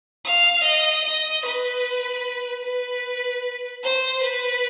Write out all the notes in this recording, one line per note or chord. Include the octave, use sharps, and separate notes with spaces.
F5
D#5
D#5
B4
B4
C5
B4